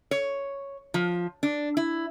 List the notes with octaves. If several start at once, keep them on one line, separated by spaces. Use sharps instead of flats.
C#5
F3
D4
E4